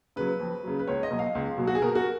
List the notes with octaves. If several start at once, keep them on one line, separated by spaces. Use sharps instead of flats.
C#3 F#3 B4
F2
C#3 F#3
B4
C#2 C#5
D#5
B2 F#3
F5
C#2
B2 F#3
F#4
G#4
B2 A#4
F#4